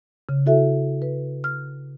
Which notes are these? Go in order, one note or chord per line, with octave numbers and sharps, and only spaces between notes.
C#3
E4 F#4 A4 E5
B4
F6